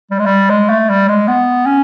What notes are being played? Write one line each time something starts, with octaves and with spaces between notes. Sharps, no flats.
G3
G#3
G3
G#3
A3
G3
G#3
B3
C#4